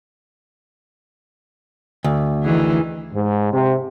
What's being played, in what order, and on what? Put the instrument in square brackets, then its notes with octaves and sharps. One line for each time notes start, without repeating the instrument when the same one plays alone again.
[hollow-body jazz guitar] D2
[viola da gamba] D#3 E3 G#4
[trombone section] G#2
C3